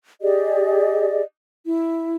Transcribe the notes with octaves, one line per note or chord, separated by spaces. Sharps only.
G4 G#4 D5 D#5
E4